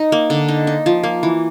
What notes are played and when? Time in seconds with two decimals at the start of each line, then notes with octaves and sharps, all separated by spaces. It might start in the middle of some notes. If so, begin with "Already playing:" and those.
Already playing: D#4
0.12 A#3
0.30 D3
0.48 D#4
0.67 D#4
0.86 F3
1.03 A#3
1.23 E3